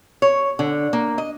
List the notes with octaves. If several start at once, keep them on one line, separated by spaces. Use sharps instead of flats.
C#5
D3
A#3
D#5